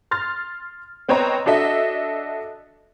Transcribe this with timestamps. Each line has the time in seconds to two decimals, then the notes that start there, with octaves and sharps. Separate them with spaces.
0.11 C6 F6 A6
1.09 B3 C4 B4 C#5 D#5 A#5
1.46 D4 F#4 A4 D#5 E5